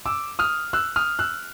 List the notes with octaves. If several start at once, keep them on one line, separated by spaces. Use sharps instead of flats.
D6 E6
D#6 F6
E6 F#6
D#6 F6
E6 F#6